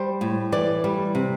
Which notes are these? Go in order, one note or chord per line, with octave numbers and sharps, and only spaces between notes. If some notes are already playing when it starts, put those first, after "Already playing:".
Already playing: G3 C5
A2
E3 D5
G3
C3